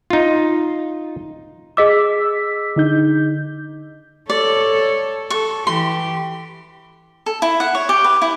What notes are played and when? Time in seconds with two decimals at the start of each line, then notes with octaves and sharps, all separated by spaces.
0.10 D#4 F4
1.77 G#4 D#5 D6 E6 B6
2.76 D3 D#4 G6
4.30 A4 C#5 D5
5.30 A4 C#6
5.67 E3 G4 C6
7.26 A4
7.42 E4
7.60 F#5
7.75 C#5
7.89 G4
8.04 B4
8.22 E4